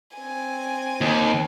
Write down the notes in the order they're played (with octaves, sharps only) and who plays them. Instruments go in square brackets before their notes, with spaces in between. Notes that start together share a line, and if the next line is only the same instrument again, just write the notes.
[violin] C4 G#5
[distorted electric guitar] D#2